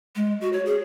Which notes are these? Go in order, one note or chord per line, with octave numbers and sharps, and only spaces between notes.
G#3
F#4
C#5
G#4